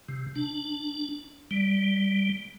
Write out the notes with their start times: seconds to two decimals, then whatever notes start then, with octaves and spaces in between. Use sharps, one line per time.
0.09 C3
0.36 D4
1.51 G3